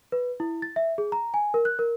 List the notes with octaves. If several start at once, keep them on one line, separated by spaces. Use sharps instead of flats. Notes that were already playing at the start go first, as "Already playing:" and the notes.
B4
E4
A6
E5
G#4
A#5
G#5
A#4
F#6
A#4